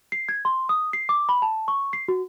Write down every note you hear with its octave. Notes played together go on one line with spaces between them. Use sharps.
C7
G#6
C6
D#6
C7
D6
B5
A5
C#6
C7
F#4